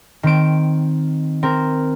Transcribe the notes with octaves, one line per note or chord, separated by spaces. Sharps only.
D#3 C4 D7
C4 A#4